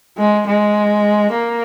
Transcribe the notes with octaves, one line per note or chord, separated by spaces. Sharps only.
G#3
G#3
A#3